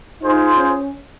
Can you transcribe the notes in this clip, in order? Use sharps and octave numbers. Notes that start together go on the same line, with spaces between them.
D#4 F4 G#4 C5
C#4